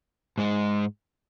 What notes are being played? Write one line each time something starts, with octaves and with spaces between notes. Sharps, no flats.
G#2 G#3 D#4